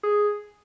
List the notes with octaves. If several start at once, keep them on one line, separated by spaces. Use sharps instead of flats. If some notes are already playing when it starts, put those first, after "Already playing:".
G#4